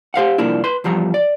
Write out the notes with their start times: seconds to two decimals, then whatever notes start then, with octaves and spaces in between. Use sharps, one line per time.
0.14 G4 C5 F5 F#5
0.38 C2 F2 F3 A#3 D4 E4
0.64 B4 C6
0.84 E2 F3 G3 A#5
1.14 D5